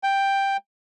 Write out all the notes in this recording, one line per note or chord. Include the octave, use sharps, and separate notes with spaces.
G5